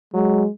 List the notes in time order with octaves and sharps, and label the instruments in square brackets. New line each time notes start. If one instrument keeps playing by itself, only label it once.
[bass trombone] F#3 [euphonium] G#3